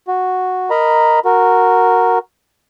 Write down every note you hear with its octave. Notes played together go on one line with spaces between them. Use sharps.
F#4
A#4 D#5 A#5 B5
F#4 A#4